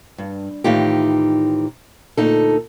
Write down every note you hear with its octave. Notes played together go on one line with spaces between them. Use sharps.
G2
A2 D#3 E3 D#4 F4 G4
D2 A#2 D#4 A4